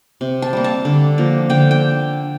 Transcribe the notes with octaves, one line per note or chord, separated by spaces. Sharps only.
C3
A5
G3 A#3
A5
D3
F3 A#3
D3 G5
G5